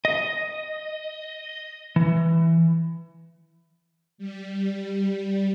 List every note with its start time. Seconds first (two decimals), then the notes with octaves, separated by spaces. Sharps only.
0.05 D#5
1.96 E3
4.18 G3